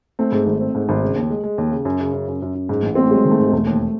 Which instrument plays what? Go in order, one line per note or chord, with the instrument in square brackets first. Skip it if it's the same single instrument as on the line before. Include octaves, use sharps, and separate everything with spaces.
[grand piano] A3 [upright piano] C4
[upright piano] G#2
G#1
C4
G#2
G#1
C#3
D#2
G#3
G#3
D#2
C#3
F#2
C#3
F#2
F#2
F#2
F#2
G#2
A1
[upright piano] A1 [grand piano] C4
[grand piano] A3
[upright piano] F#3 [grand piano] G#3
[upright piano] D#3
[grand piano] A3
[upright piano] G#2
[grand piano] G#3
[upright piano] E1 [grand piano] A3
[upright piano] D#2